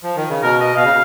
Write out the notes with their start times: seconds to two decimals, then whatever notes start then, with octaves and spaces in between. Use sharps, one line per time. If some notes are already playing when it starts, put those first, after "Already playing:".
0.03 F3
0.16 D#3
0.29 C#3
0.42 B2 A#4
0.60 D#5
0.76 B2 F5
0.84 C#3